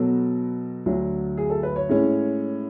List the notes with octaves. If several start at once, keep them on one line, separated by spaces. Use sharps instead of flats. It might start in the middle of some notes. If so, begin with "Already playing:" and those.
Already playing: B2 F#3 B3 A4
D2 D3 F#3
G#4
A4
B4
C#5
A2 G#3 C#4